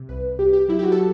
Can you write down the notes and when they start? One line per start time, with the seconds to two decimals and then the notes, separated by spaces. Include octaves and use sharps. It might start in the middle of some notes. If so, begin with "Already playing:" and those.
Already playing: C3
0.09 C2 B4
0.38 C2 G4
0.53 G4
0.68 F#3 E4
0.79 G4
0.83 F#4
0.92 A4